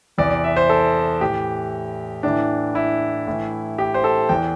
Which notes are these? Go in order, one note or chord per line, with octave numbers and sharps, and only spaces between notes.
E2 C3 E3 D5
D5
E5
C5
A4
A2 E3 G4
A2 E3 D4
E4
A2 E3
G4
C5
A4
E2 E3 G5